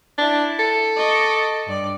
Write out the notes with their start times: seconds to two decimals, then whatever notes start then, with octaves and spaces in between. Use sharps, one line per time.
0.18 D4 E4
0.59 A4
0.97 D#5 C#6 D6
1.66 G2 D5